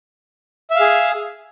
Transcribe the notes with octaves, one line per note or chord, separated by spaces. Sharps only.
G#4 E5 F5